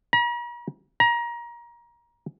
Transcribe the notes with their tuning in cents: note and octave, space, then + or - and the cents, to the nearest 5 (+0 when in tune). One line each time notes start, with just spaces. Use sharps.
A#5 +45
A#5 +25